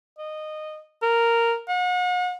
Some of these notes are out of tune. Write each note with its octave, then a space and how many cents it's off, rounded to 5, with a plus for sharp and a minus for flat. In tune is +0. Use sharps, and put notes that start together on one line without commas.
D#5 -15
A#4 -5
F#5 -40